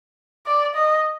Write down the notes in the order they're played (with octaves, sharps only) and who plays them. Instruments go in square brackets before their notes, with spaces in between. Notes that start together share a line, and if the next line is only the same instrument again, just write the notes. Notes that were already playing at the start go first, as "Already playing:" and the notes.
[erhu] D5
D#5